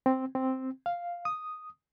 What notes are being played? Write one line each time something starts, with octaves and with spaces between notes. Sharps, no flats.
C4
C4
F5
D#6